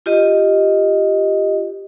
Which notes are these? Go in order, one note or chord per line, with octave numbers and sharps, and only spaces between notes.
F4 G4 D#5